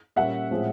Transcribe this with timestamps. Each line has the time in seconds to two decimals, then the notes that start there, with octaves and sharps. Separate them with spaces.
0.16 A#2 G3 A#3 C#4 E5 F#5
0.51 A2 F3 G#3 C4